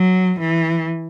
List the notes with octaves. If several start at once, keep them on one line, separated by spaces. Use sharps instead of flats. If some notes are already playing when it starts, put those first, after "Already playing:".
Already playing: F#3
E3